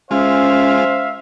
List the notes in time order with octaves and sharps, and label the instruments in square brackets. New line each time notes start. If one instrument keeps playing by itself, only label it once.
[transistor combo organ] G#3 F4 [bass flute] C#4 [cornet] C5 [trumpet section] E5 F5